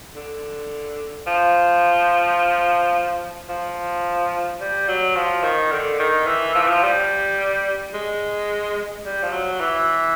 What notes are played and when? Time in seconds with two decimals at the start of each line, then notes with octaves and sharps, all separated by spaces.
0.16 D3
1.27 F3
3.49 F3
4.61 G3
4.88 F#3
5.16 F3
5.44 D#3
5.72 D3
5.99 D#3
6.26 E3
6.55 F3
6.62 E3
6.69 F3
6.83 G3
7.94 G#3
9.05 G3
9.23 F3
9.33 F#3
9.60 E3